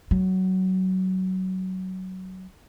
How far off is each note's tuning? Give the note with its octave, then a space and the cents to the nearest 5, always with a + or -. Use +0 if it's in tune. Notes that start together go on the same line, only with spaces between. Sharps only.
F#3 +15